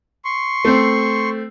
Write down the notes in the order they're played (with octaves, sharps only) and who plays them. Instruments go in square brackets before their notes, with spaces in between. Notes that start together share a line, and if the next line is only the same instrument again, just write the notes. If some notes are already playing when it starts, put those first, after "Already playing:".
[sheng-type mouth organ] C6 C#6
[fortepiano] A3 C4